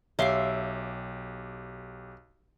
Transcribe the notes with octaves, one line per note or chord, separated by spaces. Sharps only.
B1 G4 C#5 E5 F5 C6 D6 C7